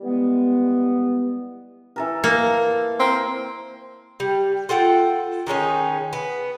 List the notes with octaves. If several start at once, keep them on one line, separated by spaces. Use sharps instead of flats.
E3 G3 G#3 B3
E3 A4 A#4
A#3
C4 A#4
G3
F4 A4 F#5 G5
D#3 G#3 C#4 D#4
B3